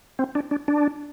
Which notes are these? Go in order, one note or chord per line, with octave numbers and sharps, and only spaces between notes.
C4
D4
D4
D4